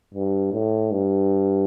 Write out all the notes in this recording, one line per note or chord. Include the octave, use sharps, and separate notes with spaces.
G2
A2
G2